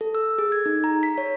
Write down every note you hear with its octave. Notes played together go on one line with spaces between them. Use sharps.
A4
E6
G#4
G#6
D#4
A#5
B6
C#5